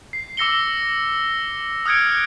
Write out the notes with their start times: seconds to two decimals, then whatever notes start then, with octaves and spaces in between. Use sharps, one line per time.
0.13 C7
0.37 D6 E6 A#6 C#7 G7
1.86 D#6 F6 F#6 G#6 C#7 D7